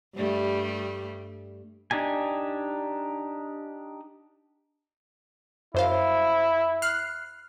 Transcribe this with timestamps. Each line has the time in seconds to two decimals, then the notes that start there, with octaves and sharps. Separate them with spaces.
0.15 G2 G3 A3
1.91 D4 D#4 G4 G#5
5.74 F#2 E4 C5 F5
6.82 F6 F#6 C7